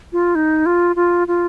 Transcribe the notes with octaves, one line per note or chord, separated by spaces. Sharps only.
F4
D#4
F4
F4
F4